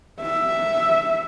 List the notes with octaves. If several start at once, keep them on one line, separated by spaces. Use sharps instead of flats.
E5